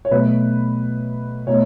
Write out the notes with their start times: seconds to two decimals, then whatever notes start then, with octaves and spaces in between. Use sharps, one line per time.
0.05 C#5
0.11 B2 F#3 A3 B4
1.47 B2 A3 D#4 C#5